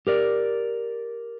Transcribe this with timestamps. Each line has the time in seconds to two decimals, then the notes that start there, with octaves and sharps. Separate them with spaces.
0.07 G4 A#4 D5